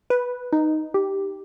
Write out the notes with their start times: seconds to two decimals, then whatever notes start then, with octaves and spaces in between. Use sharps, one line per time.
0.10 B4
0.53 D#4
0.94 G4